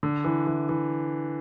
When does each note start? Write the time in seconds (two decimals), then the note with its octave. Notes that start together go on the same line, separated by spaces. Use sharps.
0.03 D3
0.25 E3
0.47 E3
0.69 E3